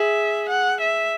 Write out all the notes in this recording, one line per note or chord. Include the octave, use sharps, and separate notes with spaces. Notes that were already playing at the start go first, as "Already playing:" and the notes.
Already playing: G#4 E5
F#5
E5